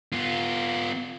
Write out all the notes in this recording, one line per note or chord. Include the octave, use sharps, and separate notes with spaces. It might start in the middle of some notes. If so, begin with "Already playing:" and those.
B3 F4